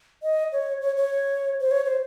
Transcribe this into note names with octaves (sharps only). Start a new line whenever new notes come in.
D#5
C#5
C#5
C#5
C5
C#5
C5